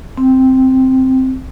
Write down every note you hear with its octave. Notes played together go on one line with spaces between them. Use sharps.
C4